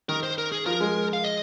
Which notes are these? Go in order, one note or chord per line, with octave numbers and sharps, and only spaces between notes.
D#3 A#4
C5
A#4
G#4
F3 A#4
G#3
F5
D#5